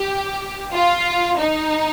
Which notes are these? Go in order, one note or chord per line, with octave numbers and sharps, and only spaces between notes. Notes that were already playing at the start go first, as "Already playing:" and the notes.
Already playing: G4
F4
D#4